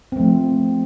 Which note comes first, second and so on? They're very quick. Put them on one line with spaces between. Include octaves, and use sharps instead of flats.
C4 A3 F3